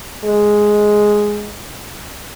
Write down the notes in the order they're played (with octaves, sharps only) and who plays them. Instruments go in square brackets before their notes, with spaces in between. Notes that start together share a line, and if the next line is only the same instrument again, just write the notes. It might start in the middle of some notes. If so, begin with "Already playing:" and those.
[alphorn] G#3